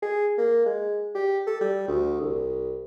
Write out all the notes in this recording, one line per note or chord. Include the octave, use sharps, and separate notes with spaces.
G#4
A#3
G#3
G4
A4
G3
D2
C2